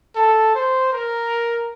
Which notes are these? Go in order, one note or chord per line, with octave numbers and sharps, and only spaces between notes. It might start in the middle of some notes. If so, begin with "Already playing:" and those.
A4
C5
A#4